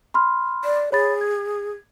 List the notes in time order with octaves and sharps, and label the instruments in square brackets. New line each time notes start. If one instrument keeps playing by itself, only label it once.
[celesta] B5 C6 F6
[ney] D5
[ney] G#4 [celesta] C#5 B5 A6
[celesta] G#6